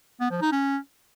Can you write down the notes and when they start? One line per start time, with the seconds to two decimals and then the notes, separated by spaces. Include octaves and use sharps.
0.21 B3
0.31 F3
0.42 D#4
0.52 C#4